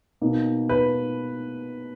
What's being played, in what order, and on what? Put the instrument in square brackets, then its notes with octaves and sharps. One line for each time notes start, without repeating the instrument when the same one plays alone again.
[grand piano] B2 A#3 D#4
[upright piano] B4